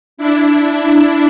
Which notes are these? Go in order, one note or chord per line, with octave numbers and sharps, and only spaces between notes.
D4 E4